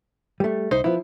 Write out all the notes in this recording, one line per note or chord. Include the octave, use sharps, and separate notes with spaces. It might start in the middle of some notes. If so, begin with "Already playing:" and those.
G3 A3
C2 D#4 C5
F3 B3 E4